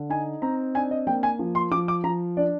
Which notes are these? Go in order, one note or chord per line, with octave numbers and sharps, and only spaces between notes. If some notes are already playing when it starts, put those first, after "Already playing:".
Already playing: D3
D#4 G#5
C4 A#5
D4 G#5
D#5
A#3 G5
G#5
F3
C6
F3 D6
D6
F3 A#5
D4 D5